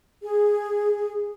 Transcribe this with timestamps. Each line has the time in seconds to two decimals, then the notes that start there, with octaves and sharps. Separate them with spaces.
0.23 G#4